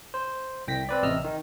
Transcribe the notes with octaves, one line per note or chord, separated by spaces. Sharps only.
C5
C2 G5 A#6 B6
C4 B4 D5
A1 C3 G4 D#5 E6 F6
D#3